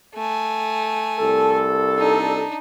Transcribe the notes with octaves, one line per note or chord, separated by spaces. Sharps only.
A3 G#5
C2 A4
D4 D#4